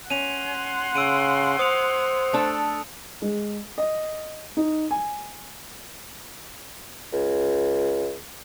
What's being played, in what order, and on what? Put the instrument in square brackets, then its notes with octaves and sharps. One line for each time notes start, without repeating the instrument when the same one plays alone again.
[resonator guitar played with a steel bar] C#4 [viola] F#5 C6 [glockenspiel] D#7 F7
[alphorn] C#3 [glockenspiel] E6 D7 D#7
[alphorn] C5 [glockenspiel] D#6 C#7 F7
[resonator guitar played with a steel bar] A3 D4 A4
[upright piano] G#3
D#5
D#4
G#5
[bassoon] C#2